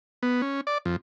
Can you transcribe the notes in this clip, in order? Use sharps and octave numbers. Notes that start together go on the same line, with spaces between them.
B3
C#4
D5
F2